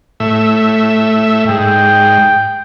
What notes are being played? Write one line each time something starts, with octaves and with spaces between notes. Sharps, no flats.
A2 E5
G#2 G5